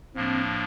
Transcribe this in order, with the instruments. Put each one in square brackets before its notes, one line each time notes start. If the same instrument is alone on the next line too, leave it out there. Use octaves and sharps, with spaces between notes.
[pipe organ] A2 F3 A#3 D4 [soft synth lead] C4